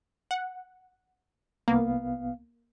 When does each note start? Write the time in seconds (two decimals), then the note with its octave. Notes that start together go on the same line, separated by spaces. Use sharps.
0.31 F#5
1.68 C2 A#3 B3 F5